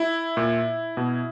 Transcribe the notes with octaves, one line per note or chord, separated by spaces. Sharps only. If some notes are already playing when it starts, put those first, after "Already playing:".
Already playing: E4
A#2
B2